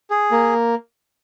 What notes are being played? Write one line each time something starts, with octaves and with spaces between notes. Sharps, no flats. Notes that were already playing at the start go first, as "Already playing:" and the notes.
G#4
A#3